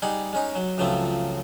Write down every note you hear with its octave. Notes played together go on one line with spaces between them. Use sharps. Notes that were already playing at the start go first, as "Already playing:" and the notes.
G3 D#4 G#4 F#5
G#3 C#4 D#4
F#3
C#2 F3 F#3 A3 C4